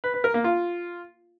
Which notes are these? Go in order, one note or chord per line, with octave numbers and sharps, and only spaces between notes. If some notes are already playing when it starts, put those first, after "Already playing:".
B4
B4
A#4
A#3
F4